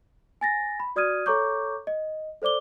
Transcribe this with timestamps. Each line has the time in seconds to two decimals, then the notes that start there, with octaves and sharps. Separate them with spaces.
0.41 G#5 A6 A#6
0.80 B5
0.96 F#4 D5 D#6 F6 G#6 D#7
1.26 A4 C#5 A#5 C#6 D6 G6
1.87 D#5
2.42 A4 C5 D5 D6 G7